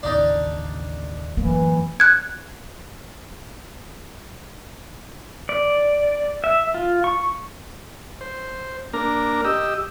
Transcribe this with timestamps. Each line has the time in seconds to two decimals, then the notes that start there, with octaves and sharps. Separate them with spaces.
0.03 A1 D#2 C#3 D4 D#4 D5
1.37 F#2 A2 E3 A#3
2.00 F#6 G#6
5.49 D5
6.44 E5
6.74 F4
7.04 C#6
8.21 C5
8.94 A#3 D4 A#4 A#5
9.44 G4 D#5 E6